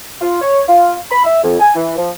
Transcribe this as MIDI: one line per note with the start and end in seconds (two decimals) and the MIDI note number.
0.21 0.37 65
0.42 0.62 73
0.68 0.95 65
1.11 1.22 83
1.24 1.43 76
1.43 1.56 41
1.60 1.74 80
1.75 1.96 52
1.97 2.10 53